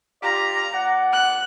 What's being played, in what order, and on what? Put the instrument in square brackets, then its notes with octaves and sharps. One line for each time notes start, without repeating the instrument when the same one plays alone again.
[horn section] F4 G4 D5 [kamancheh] A#5
[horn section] A#2 D5 F#5
[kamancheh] F#6